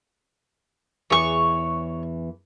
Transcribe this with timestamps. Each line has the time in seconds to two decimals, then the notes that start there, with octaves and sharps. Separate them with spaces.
1.10 E2 E3 G#4 C#5 C#6